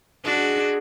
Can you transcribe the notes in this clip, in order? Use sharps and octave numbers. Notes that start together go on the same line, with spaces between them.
G#3 D4 F#4